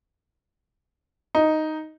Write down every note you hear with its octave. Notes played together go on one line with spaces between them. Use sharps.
D#4